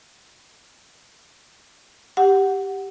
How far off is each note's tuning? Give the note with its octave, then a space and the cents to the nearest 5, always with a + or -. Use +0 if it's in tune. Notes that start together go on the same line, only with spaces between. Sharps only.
G4 +0 F#5 +0